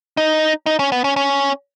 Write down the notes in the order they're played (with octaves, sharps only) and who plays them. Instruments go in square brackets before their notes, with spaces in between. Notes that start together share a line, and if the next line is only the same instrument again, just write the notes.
[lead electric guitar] D#4
D#4
C#4
B3
C#4
C#4